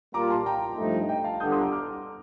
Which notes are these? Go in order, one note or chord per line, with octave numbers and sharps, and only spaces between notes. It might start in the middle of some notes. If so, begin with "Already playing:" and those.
A#2 G3 A#3 F4 A#5 D6
A5 C6
G5 A#5
G2 F3 A3 D#4
D#5 G5
F5 A5
G1 G2 D3 D#6 G6
C6 D#6
A#5 D6
D6 F6